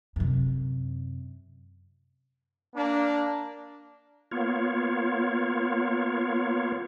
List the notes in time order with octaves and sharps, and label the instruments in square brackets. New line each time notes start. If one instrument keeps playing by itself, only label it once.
[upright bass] F#2 C3
[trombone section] A#3 D4
[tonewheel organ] A#3 B3 F4 C#5